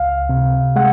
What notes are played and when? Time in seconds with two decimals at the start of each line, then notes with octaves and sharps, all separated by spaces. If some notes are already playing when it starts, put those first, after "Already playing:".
Already playing: C#2 F5
0.29 C3
0.76 G#3 F#5